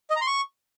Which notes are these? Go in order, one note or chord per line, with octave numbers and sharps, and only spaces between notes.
D#5
A#5
C6
C#6